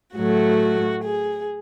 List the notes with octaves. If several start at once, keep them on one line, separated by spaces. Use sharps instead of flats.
A2 F#3 A3 F#4
G#4